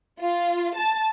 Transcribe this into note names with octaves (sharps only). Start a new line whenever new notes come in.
F4
A5